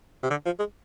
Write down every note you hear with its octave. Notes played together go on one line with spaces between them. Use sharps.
C3
D3
F3
G#3